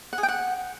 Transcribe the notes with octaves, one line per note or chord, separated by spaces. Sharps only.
F#5
G#4
G5
F#5